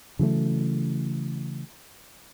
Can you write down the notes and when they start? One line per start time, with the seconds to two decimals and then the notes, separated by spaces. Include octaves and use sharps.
0.19 C#3 E3 F#3 A3